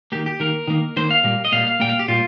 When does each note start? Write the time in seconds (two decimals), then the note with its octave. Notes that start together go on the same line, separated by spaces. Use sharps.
0.12 D#3 A#3 G4
0.26 G4
0.40 D#3 A#3 A#4
0.68 D#3 A#3
0.97 D#3 A#3 C5
1.11 F5
1.23 A#2 G3 A#3
1.45 D#5
1.52 A#2 G3 A#3 F5
1.67 F5
1.80 A#2 G3 A#3 G5
1.89 F5
1.99 G4
2.08 A#2 G3 F4